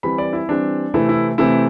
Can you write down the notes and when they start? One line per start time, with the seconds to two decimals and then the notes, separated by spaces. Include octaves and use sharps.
0.03 E3 G3 C4 B5
0.18 D5
0.33 E4
0.49 E3 G3 C4 D4
0.94 C3 E3 A3 C4 E4
1.09 E4
1.38 C3 E3 A3 C4 E4